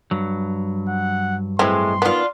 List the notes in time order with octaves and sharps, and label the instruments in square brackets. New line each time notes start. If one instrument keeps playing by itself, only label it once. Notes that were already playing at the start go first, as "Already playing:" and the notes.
[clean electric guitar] G2 F#3
[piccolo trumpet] F#5
[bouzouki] A2 G#3 [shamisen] E3 C4 [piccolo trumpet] C6
[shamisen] D#3 B3 [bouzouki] D4 F4